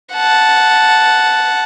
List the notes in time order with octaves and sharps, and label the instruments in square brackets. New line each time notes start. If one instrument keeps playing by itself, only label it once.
[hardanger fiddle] F#5 A5